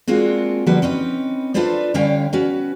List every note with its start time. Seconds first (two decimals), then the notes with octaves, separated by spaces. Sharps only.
0.08 G#3 A#3 C4 D4 F4 F#4
0.66 D3 F3 G3 A#3 F#4 B4
0.82 C4 C#4 D#4 B4
1.54 D4 F4 A4 B4 C5 D5
1.94 D3 G3 C#4 C#5 F5 G5
2.33 C#4 F#4 B4